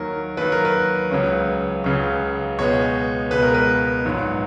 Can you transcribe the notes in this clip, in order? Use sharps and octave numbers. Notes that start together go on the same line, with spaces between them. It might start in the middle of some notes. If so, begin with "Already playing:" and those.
Already playing: D#2 D#3 F#3 A#4
D#2 D#3 F#3 B4
A#4
B4
C#2 C#3 F#3 C#4
C#2 C#3 F#3 C#4
C#2 B2 G#3 B3 C#5
C#2 B2 G#3 B3 B4
A#4
B4
A#1 G#2 F#3